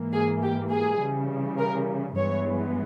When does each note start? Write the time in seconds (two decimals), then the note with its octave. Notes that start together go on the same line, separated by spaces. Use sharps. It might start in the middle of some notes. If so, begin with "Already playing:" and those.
Already playing: G#2 E3 A#3
0.13 G#4
0.42 G4
0.71 G#4
1.00 C#3 E3 G3
1.59 A#4
2.17 G2 E3 G#3 B3 C#5